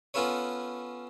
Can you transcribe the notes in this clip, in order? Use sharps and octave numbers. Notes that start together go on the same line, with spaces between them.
B3 C#4 F4 A4 B4 C#5